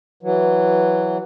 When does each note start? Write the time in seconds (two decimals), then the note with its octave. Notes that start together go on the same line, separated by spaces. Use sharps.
0.23 E3 F#3